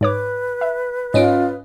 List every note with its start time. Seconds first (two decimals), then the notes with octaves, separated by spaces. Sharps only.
0.01 G#2 B4 C#5 D6
0.61 E5
1.14 G#2 C#4 F4 D#5 D7